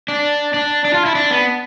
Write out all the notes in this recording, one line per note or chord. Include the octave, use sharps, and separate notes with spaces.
D4
D4
D4
F4
E4
D4
B3